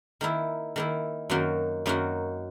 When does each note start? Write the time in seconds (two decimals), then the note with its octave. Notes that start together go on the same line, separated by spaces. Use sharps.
0.21 D#3 A#3 E4
0.76 D#3 A#3 E4
1.30 F#2 D#3 A#3 D#4 F#4
1.86 F#2 D#3 A#3 D#4 F#4